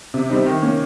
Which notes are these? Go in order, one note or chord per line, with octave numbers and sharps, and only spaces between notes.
C3
G3 C4 D#4
D#3
A#3 C#4